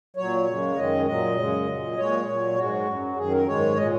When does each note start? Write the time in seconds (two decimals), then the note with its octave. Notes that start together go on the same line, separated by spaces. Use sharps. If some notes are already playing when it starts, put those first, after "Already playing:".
0.16 A#2 F#3 C#5
0.46 F#2 C#3 G#3
0.76 F#2 D#3 G#3 D#5
1.06 A#2 F#3 D#5
1.37 F#2 C#3 G#3
1.66 A#2 F#3
1.97 A#2 G#3 C#5
2.26 A#2 F#3
2.56 G#2 G#3 F#4
2.86 F#2 F#3
3.16 F#2 D#3 F#3 G#4
3.32 A#4
3.46 G#2 D#3 G#3 C#5
3.76 A#2 G#3 D#5